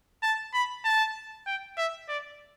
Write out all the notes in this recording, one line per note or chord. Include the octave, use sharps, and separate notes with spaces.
A5
B5
A5
G5
E5
D5